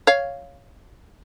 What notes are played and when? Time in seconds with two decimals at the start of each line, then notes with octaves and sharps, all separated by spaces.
0.07 C#5 F5